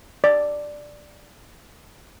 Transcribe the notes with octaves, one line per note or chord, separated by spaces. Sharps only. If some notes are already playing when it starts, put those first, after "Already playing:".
D5